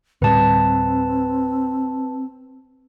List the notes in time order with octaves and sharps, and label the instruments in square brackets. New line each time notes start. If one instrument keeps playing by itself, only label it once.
[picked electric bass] D2 A2 G3 [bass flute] C4 [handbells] B4 A5